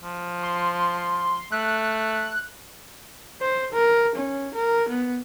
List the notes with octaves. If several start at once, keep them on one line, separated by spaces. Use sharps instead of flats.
F3
C6
A3 F#6
C5
A#4
C#4
A#4
B3